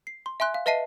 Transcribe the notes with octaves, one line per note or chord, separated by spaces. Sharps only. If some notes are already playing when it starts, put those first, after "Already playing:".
C7
C6
E5 G#5 C6 F#6
F5
B4 D#5 E5 A5 C7 D#7